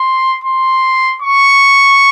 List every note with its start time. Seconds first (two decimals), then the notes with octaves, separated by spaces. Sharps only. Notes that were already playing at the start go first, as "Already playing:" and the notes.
Already playing: C6
0.44 C6
1.22 C#6